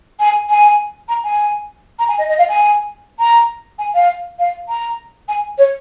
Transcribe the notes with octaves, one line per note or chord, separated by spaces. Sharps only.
G#5
G#5
A#5
G#5
A#5
G#5
D#5
D#5
F5
G#5
A#5
G#5
F5
F5
A#5
G#5
C#5